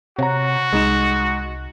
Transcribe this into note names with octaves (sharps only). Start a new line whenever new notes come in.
C3 F#4 C#5 F#5 A#5
C2 G#3 D#4 E7